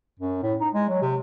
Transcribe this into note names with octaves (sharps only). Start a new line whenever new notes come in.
F#2
A2
D#4
G#3
F#3
C3